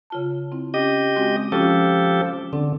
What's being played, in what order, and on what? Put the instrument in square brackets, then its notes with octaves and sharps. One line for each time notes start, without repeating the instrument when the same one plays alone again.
[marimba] C#3 F4 A5
C4 E4
[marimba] C#4 [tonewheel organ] G4 D#5
[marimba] G#3 C4 F#4
[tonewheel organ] F3 G4 A4 [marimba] C#4 F4
[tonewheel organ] D3 [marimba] C4 D4